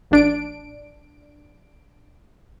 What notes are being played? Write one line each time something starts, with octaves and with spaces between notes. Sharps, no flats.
A1 D4 D7